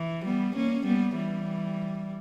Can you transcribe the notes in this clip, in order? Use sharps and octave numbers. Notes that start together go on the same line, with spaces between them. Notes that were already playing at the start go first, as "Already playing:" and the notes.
Already playing: E3
G3 B3
A#3 C#4
G3 B3
E3 G3